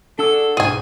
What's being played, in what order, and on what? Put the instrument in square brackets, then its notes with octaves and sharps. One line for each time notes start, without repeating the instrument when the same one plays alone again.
[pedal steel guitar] D4 F#5 E6 [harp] F#4 G#4 D5 [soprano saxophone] A4
[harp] C2 G#2 B2 [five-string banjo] G#4 G#5